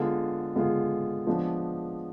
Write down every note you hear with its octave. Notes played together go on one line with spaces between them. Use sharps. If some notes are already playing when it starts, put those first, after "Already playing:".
Already playing: D3 G#3 B3 F4 G#4
D3 G#3 B3 F4 G#4
F3 G#3 B3 D4